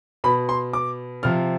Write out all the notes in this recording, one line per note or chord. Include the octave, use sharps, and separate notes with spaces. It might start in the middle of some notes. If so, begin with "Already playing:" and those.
B2 B5
C6
D6
C3 F3 F6